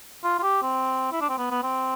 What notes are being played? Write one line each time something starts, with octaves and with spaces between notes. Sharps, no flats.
F4
F4
G4
C4
E4
D4
C4
B3
B3
C4